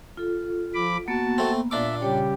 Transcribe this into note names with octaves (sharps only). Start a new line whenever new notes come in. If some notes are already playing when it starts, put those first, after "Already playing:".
F4 A4
F3 B5 D6
A#3 B3 F#4 A5
A3 C4
A#2 D4 E5 D6
C#3 G3 G4 C#5 G5